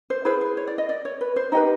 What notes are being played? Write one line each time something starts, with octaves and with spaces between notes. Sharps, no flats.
C5
E4 G#4 B4 C5
C5
C#5
D5
D#5
D5
C#5
B4
C5
D#4 G4 B4 D#5